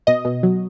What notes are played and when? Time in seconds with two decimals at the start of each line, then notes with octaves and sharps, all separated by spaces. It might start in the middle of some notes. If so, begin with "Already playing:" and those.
0.07 B2 D#5
0.25 B2
0.43 F#3